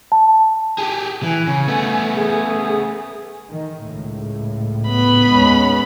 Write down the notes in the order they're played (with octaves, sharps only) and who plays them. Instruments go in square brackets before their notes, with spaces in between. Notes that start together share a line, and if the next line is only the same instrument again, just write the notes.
[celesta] A5
[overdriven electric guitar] G4 G#4
[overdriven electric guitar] E3 [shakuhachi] G#5
[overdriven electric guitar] C#3
A3 B3
[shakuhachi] G#4
[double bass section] D#3
C#2 A2
[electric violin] B3 B5
[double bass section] D#2 G#3 C#4